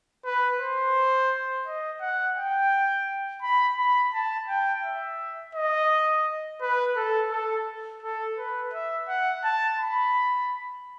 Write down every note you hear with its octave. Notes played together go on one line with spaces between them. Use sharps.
B4
C5
D#5
F#5
G5
B5
B5
A5
G5
E5
D#5
B4
A4
A4
A4
B4
E5
F#5
A5
B5